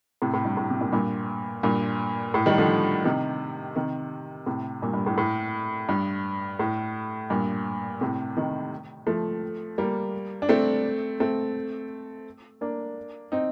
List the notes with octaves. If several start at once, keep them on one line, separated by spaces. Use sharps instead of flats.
A2 C3
A2
G2
A2
C3
G2 A#2
G2 A#2
G2 A#2
A2
D#3 G3
D3 F3
C3 D#3
C3 D#3
A2 C3
G2 A#2
G2
A2
A2
G2
A2
G2 A#2
A2 C3
C3 D#3
F3 A3
G3 A#3
D4
A3 C4
A3 C4
A#3 D4
C4 D#4